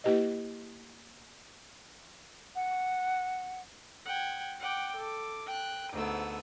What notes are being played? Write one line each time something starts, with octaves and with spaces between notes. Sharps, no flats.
A#3 E4 G4 B4 D#5
F#5
F#5 G5 G#6
F#5 G5 D6
A4 D6
G5 F#6
D2 G#2 A3 B3 E6